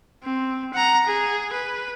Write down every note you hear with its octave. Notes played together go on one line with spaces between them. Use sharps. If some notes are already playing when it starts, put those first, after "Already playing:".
C4
F#5 A#5
G#4
B4